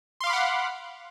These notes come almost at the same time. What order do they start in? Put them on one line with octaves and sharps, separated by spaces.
C6 F5 D6 B5 F#5